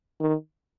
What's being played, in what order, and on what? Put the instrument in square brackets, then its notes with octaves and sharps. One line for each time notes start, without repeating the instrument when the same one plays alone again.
[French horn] D#3